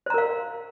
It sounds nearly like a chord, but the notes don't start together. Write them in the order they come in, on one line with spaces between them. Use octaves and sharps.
C5 A#5 A#4 F5